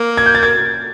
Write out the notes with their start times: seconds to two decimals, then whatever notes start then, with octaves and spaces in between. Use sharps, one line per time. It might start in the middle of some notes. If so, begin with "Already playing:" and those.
Already playing: A#3
0.17 G#6
0.26 G6
0.35 A6
0.43 G#6